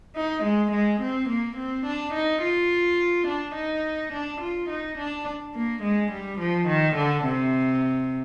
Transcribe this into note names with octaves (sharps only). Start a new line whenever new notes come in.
D#4
G#3
G#3
C4
A#3
C4
D4
D#4
F4
D4
D#4
D4
F4
D#4
D4
A#3
G#3
G3
F3
D#3
D3
C3